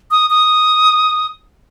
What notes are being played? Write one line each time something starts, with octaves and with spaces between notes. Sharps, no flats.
D#6
D#6